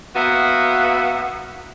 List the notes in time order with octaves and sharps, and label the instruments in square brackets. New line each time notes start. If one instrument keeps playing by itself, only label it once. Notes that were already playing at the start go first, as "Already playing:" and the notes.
[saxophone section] A#3 B3 F#4 E5